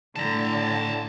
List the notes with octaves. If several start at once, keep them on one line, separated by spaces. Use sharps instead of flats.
A2 D3 A5 A#5